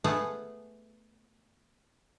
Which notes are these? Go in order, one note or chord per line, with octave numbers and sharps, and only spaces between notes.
A3 B3 G#4 F5 F#5 A5